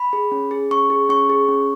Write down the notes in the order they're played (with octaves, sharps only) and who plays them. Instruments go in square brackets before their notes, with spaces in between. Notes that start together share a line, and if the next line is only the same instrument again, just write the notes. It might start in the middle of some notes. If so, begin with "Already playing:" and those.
Already playing: [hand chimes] B5
G#4
C#4
G#4
C#4 C#6
G#4
C#4 C#6
G#4
C#4